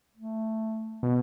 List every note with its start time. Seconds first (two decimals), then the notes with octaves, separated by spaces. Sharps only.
0.16 A3
1.03 B2